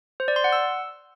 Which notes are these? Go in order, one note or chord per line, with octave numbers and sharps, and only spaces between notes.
C5
D5
C6
F#5
E6